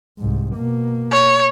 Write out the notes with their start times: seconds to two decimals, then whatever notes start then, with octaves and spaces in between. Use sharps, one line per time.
0.19 C2 G#2
0.55 B2 A#3
1.11 C#5